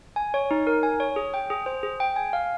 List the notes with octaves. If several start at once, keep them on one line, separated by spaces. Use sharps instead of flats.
G#5
C#5
D#4
A#4
G#5
C#5
G#4
G5
G#4
C5
G#4
G5
G#5
F5